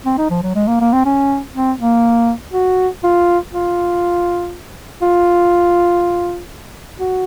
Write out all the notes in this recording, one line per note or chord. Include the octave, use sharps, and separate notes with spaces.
C4
D#4
F3
F#3
G#3
A#3
A#3
C4
C#4
C4
A#3
F#4
F4
F4
F4
F#4